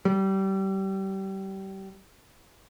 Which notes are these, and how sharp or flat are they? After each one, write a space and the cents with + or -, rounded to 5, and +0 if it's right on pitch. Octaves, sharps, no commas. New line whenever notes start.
G3 -25